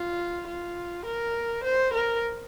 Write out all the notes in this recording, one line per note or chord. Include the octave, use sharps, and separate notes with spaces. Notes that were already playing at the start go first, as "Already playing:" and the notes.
Already playing: F4
F4
A#4
C5
A#4